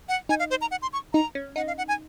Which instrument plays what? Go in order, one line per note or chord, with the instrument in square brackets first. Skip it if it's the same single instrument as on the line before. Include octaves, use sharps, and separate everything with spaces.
[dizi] F#5
[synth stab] D#4 [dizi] G#5
[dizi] F5
C5
A#5
F#5
C6
C#6
[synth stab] D#4 [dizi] A#5
[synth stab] C#4
[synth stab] D#4 [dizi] F#5
[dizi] F5
F#5
G#5